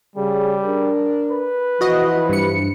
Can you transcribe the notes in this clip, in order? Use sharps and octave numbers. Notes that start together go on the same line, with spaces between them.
C#3 G3 G#4
D4 A#4
B4
E3 F3 F#4 D#5
G2 C#7